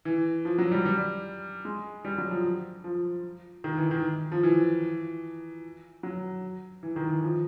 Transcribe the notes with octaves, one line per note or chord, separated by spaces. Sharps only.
E3
F3
F#3
G3
G3
G#3
G3
F#3
F3
F3
D#3
E3
D#3
F3
E3
F#3
E3
D#3
E3
F3